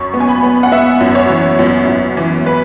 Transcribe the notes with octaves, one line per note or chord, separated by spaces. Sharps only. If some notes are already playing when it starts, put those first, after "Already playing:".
Already playing: F#2 C#6
B3
G#5
B5
B3
F#5
B3 E5
F#2
C#5
E3
F#2
F#2
E3
B4